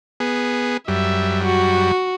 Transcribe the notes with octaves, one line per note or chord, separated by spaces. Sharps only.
B3 G#4
F#2 G3 E5
F#4